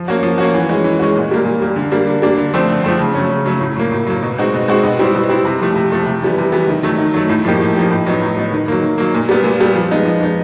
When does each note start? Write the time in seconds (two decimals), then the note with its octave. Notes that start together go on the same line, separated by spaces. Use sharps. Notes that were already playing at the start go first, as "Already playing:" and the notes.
Already playing: F3
0.08 A#3 C#4 F#4
0.23 F3
0.38 A#3 C#4 F#4
0.54 E3
0.69 G#3 C#4 F#4
0.84 E3
0.99 G#3 C#4 F#4
1.16 A#2
1.31 G3 A#3
1.45 A#2
1.62 G3 A#3
1.76 D3
1.91 G3 A#3 D4
2.07 D3
2.22 G3 A#3 D4
2.38 D3
2.54 F3 A3 C4
2.69 D3
2.84 F3 A3 C4
3.00 C#3
3.14 F#3 A3 C#4
3.30 C#3
3.46 F#3 A3 C#4
3.61 A2
3.76 F#3 A#3
3.92 A2
4.07 F#3 A#3
4.23 B2
4.38 G#3 C4 D#4 F#4
4.54 B2
4.68 G#3 C4 D#4 F#4
4.83 B2
4.99 G3 C4 E4
5.15 B2
5.29 G3 C4 E4
5.45 C3
5.61 F3 A3
5.76 C3
5.92 F3 A3
6.06 C3
6.22 E3 G3 B3
6.38 C3
6.52 E3 G3 B3
6.68 D#3
6.83 F#3 A3
6.99 D#3
7.14 F#3 A3
7.29 A2
7.45 F3 A#3 D#4 G4
7.60 A2
7.76 F3 A#3 D#4 G4
7.91 A2
8.06 F#3 B3 D#4
8.21 A2
8.37 F#3 B3 D#4
8.52 D#3
8.68 F#3 A#3
8.83 D#3
8.98 F#3 A#3
9.14 A#2
9.29 G3 B3
9.44 A#2
9.60 G3 B3
9.75 F3
9.91 G#3 B3 D#4
10.06 F3
10.21 G#3 B3 D#4